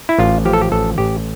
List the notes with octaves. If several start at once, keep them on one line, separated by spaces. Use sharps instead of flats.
E4
A1 F4
F3 G4
A4
G4
A1 A4
A1 G4